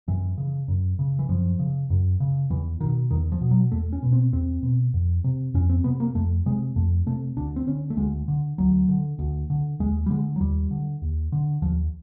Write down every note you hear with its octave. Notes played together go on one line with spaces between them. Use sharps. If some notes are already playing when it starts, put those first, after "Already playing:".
F#2 E3
C#3
F#2
C#3
E3
F#2 F3
C#3
F#2
C#3
E2 E3
B2 D#3
E2 D#3
F3
B2
F#3
E2 A3
C#4
B2
C4
E2 C4
B2
F2
C3
F2 C#4
C4
C3 B3
A#3
F2 A3
C3 G#3
F2 A3
C3 A3
D2 D4
C4
D3 C#4
A3
D2 G#3
D3
D2 F#3
D3
D2
D3
D#2 G#3
G3
D3 G#3
F#3
D#2 G3
D3
D#2
D3
D#2 F3